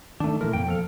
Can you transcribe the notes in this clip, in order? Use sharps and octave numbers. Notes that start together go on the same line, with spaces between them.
D#3 A3 D4
A#2 E3 A3 A#4
F2 B2 A#3 G5
F3 A4 F5